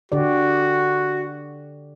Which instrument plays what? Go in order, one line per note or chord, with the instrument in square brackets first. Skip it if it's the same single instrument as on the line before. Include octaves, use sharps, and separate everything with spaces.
[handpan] D3 G4 D5 [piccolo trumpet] F#4